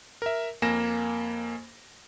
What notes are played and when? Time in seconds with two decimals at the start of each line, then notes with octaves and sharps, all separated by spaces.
0.22 A#4 E5
0.62 F2 A#3 G#5 A#6 E7